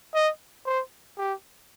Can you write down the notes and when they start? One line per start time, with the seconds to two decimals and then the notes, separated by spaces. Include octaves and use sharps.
0.14 D#5
0.65 C5
1.18 G4